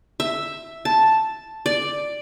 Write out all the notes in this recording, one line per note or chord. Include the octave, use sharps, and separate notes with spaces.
E5
A5
D5